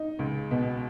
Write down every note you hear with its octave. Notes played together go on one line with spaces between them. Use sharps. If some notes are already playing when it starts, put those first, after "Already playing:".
Already playing: D#4
C#2
B2